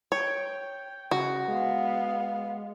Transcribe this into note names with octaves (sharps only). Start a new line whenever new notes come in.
C#5 G5
C#3 F#4
G#3 B3 F5